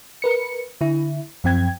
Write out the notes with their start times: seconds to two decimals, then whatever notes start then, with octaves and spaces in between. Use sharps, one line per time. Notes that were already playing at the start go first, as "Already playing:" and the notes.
0.22 A#4 B4 C#7
0.81 D3 E4
1.44 F#2 F3 C4 G5 G#6